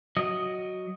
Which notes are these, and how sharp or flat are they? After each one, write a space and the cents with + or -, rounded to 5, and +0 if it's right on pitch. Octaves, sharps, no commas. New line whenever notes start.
F#3 +0 D#5 +0